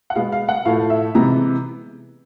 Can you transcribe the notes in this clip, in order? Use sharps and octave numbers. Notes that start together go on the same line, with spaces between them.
F#5
B2 G#3 B3 F5
F5
F#5
A2 F3 A3 F5
E5
C3 E3 G#3 B3 A#5